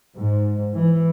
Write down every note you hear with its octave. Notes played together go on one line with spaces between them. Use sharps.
G#2
E3